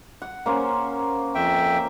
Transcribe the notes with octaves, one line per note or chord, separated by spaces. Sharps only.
F#5
A#3 C#4 C5
F2 E5 G5